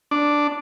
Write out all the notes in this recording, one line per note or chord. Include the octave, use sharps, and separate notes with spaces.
D4